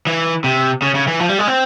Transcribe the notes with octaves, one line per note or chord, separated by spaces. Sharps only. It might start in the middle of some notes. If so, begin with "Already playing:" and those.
E3
C3
C#3
C#3
E3
F3
G3
G#3
C4